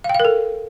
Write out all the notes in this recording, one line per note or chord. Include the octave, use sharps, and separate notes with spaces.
F5
G5
F5
A#4
A4